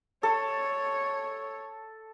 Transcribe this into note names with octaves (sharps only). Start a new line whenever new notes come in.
A4 C#5